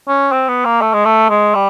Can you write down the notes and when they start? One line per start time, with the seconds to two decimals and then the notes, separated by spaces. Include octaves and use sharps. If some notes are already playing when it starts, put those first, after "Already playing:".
0.08 C#4
0.32 C4
0.48 B3
0.65 A#3
0.81 A3
0.93 G#3
1.05 A3
1.30 G#3
1.54 G3